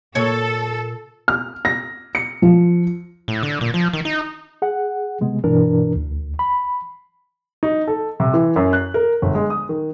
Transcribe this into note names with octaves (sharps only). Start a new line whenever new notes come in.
A#2 A4 C#5
F6
A#6
C#7
F3
A2
D3
A#2
F3
D#3
D#4
G#4 F#5
C3 G#3 B3
G2 B2 E3 D4 A#4
D2
B5
D#4
A4
C3
E3
F#2
F#6
A#4
G1
G#3
D#6
D#3